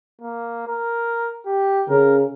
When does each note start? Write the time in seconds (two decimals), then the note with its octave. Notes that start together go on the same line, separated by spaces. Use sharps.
0.21 A#3
0.67 A#4
1.46 G4
1.89 C#3 A#4